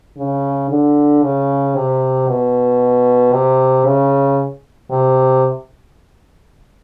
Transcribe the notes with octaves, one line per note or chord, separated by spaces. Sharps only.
C#3
D3
C#3
C3
B2
C3
C#3
C3